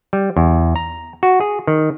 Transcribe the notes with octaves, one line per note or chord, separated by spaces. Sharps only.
G3
E2
A#5
F#4
G#4
D#3